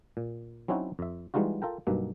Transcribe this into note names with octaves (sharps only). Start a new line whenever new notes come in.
A#2
F#3 C4 C#4 D#4 E4 F#4
F2 E5
E3 G3 G#3 D#4 F4 F#4
F4 A4 A#4 G5
B1 G2 B2 A#3